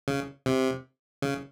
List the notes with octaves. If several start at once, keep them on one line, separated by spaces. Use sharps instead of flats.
C#3
C3
C#3